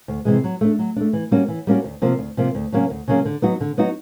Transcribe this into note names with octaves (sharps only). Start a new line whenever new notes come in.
D2
C3 E3 G#3
F#3
A3 D4
F#3
A3 D4
E3
G3 A#3 C#4 F#4
E3
G3 A#3 C#4 F#4
D2
C3 F3 A#3
D2
C3 F3 A#3
D2
C#3 F#3 A#3 C#4
D2
C#3 F#3 A#3 C#4
D3
F#3 B3 D#4 F#4
D3
F#3 B3 D#4 F#4